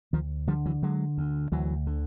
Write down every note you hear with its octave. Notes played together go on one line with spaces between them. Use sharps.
D2 D#3 F3
D3 F3 G3
E3 F#3
D3 F#3 G#3
D2
D2 E3 F#3
D3